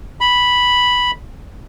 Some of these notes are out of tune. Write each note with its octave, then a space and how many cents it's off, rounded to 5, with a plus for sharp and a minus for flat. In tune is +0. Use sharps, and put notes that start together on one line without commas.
B5 -5